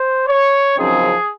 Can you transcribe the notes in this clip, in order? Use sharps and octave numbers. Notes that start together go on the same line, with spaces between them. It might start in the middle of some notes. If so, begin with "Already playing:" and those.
Already playing: C5
C#5
F#2 C#3 F3 C4 D#4 G#4